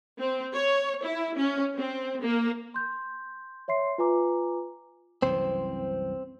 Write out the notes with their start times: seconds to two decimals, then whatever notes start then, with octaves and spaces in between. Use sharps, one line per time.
0.18 C4
0.53 C#5
1.02 E4
1.35 C#4
1.76 C4
2.21 A#3
2.74 C6 G6
3.68 C#5 E5 C6 C7
3.98 F4 B4 G#5 A#5 D6
5.22 C2 F#2 E3 C4 C5